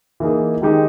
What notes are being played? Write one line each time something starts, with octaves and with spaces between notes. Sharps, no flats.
E3 A#3 D#4 G#4
D#3 G#3 D#4 G4